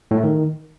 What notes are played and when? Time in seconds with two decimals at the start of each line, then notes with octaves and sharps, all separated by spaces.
0.11 A2
0.17 A3
0.24 D#3